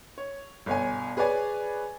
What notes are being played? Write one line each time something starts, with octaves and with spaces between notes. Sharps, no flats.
C#5
G1 B2 C#5 G#5
G#4 B4 C#5 D5 G#5